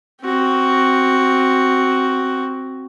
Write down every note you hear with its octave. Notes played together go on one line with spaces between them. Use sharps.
C4 F#4